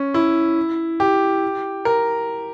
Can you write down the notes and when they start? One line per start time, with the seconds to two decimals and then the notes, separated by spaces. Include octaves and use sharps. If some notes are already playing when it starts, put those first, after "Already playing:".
Already playing: C#4
0.14 E4
1.00 G4
1.85 A#4